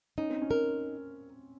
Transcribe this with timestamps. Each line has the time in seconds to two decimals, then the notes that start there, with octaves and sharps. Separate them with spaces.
0.18 C#4 D#4
0.30 C4
0.42 C#4
0.51 A#4